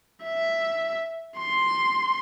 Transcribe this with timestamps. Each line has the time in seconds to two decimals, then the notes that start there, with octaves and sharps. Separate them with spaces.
0.24 E5
1.37 C6